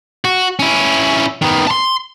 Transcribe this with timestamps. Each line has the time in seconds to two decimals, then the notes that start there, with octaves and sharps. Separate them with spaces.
0.25 F#4
0.59 C#4 E4
1.42 D#3 B3
1.67 A5 C6